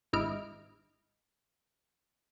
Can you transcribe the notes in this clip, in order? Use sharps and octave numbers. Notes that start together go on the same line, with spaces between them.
G#1 G#2 E4 D#5 F6 D7